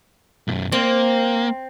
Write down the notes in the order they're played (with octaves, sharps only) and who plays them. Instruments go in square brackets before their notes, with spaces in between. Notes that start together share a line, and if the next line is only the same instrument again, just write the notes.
[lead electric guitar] B1 F#2
[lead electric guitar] A#3 [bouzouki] C4